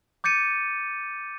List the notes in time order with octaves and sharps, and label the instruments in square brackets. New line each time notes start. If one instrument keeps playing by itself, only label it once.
[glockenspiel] D6 G6 A6 C#7 D#7